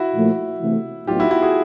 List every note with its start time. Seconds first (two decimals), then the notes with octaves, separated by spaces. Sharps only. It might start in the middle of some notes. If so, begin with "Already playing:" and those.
Already playing: E4 F#4
0.15 A#2 F3 A3
0.61 C3 E3 A3
1.07 A2 F#3 B3 D#4 F4 G4
1.19 E4 F#4
1.31 E4 F#4
1.42 F#4 G#4